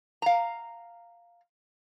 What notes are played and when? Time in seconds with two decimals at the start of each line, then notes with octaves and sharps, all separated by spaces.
0.22 F5 A#5